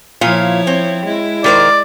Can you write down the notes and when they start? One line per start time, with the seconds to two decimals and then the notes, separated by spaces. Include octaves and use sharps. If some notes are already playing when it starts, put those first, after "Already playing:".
0.21 A#2 F3 E4 F4 C#5 F5
0.67 C4
1.05 G#3 E4
1.44 D#3 A#4 C5 D5